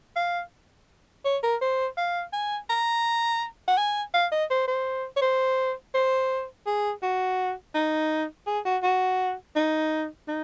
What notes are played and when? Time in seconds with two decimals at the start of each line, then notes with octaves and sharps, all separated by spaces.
0.16 F5
1.25 C#5
1.43 A#4
1.61 C5
1.97 F5
2.33 G#5
2.70 A#5
3.68 F#5
3.78 G#5
4.14 F5
4.32 D#5
4.50 C5
4.68 C5
5.16 C#5
5.22 C5
5.94 C5
6.67 G#4
7.02 F#4
7.75 D#4
8.47 G#4
8.65 F#4
8.83 F#4
9.56 D#4
10.28 D#4